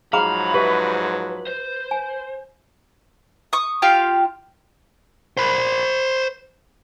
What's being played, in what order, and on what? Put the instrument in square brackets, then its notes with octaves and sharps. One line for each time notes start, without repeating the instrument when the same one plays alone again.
[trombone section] G#2 F3 F#3 [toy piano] G#4 A#5 D6 [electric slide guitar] F5 [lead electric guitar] B5
[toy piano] G4 E5 [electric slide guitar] B4
[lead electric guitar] C5
[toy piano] G#5
[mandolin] C#6 D#6
F4 G4 F5 G5
[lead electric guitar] C5 B5